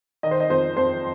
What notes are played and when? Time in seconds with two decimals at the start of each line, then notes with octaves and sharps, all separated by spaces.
0.23 D#3 D#5
0.31 C5
0.40 D#5
0.50 F2 C5
0.76 F2 C5